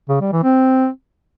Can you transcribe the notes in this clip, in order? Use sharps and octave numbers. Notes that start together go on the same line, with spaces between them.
C#3
G3
E3
C4